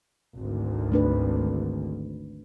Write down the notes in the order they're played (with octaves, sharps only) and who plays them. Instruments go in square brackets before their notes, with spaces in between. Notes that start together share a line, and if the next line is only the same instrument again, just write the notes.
[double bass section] G#1 D2
[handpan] A3 D4 B4